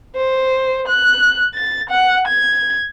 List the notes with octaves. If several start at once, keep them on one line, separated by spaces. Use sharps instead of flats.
C5
F#6
A6
F#5
G#6